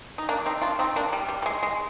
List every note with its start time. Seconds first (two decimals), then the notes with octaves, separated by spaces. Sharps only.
0.18 D#4
0.29 A#3 D4
0.46 C4 D#4
0.62 D4 F4
0.79 C4 D#4
0.96 A#3 D4
1.13 G3
1.28 G3
1.42 G3
1.46 G#3
1.63 G#3